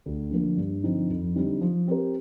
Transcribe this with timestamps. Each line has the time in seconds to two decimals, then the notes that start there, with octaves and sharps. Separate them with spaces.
0.06 D2
0.31 D3 F3 A#3
0.57 G2
0.84 D3 F3 C4 D#4
1.10 F2
1.35 D3 G3 C4 D#4
1.61 F3
1.88 C4 G4 A#4